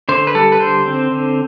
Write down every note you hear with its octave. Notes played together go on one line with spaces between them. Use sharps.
D3 C5
B4
G3 A4
B4
D3 C5
C4
D3